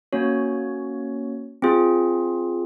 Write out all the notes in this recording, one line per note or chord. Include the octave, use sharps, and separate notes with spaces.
A#3 C#4 F#4 C#5
C4 F4 G#4